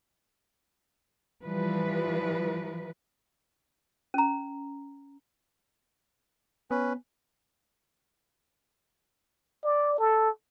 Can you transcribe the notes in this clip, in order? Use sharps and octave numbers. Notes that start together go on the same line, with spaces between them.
E3 F3 G3 B4
C#4 A#5
B3 C#4 B4
D5
A4